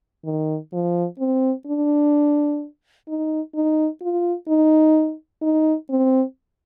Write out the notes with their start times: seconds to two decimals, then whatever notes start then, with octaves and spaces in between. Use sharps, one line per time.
0.25 D#3
0.73 F3
1.19 C4
1.67 D4
3.08 D#4
3.55 D#4
4.01 F4
4.48 D#4
5.42 D#4
5.90 C4